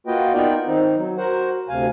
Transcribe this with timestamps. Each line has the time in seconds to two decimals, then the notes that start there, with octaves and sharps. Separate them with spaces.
0.07 A#3 F4 F#4 B4 D#5 G5
0.33 B3 D#4 F4 A#4 D5 G5
0.67 D#3 C4 D#4
0.97 F#3
1.17 F#4 A#4 C5 F#5
1.69 D2 C3 F5 G#5